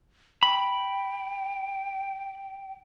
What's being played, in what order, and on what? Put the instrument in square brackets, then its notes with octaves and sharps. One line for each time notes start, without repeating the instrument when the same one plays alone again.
[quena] G5 [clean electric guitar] B5